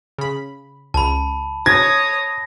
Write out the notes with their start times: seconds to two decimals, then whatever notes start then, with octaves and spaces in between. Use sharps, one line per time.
0.18 C#3 B5
0.94 C#2 A5 B5
1.66 C#5 D#6 G#6 A#6